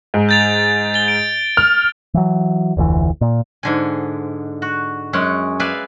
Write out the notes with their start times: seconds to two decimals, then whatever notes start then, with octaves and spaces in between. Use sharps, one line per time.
0.14 G#2
0.29 G6 A6 F7
0.94 A6 G7
1.08 D7
1.57 F6
2.14 E3 F#3
2.77 F1 D2 A#2 E3
3.21 A#2
3.63 G#2 D3 G#5
4.62 F#4
5.13 F#2 G#3 C#4 F#5
5.60 B4 D5 E5 F5 G#5